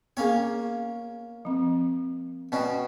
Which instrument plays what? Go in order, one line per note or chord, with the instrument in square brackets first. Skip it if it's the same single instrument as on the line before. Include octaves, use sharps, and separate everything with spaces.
[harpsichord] A#3 C#4 C#5 [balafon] B3 G#4
[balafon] F3 C4
[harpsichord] B2 C#4 F#4 [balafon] D5 G5